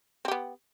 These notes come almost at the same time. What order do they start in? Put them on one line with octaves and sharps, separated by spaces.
C4 G4 B3